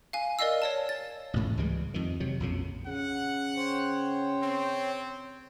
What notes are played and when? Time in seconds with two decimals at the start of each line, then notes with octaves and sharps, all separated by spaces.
0.13 F5 G#5
0.39 A#4 D5 D#5 F5 E6
0.62 C#5 D5 A5
0.89 A6
1.34 A1 G#2
1.57 C#2 E3 G3 G#3
1.94 F2 D#3
2.20 C3 F#3
2.40 A#1 F2 C#3
2.87 C#3 F#5
3.56 C5 C#5 G5
4.42 C4